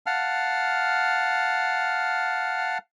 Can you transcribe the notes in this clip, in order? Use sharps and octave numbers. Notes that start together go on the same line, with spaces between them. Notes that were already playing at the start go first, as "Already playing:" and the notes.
F5 F#5 A5 F6